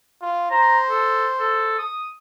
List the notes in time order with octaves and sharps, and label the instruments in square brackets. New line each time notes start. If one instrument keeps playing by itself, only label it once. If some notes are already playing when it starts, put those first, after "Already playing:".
[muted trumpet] F4
[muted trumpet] C5 [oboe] A#5
[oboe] A4
A4
D#6